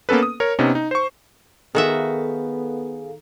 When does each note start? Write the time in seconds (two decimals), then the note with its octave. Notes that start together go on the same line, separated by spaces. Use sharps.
0.09 A#3 B3 C#4 A4 B4
0.23 D#6
0.40 A#4 C#5
0.59 C3 B3 C#4 D#4
0.75 D#4
0.91 C5 C#6
1.75 D#3 B3 F#4 G#4 A4 E5 F5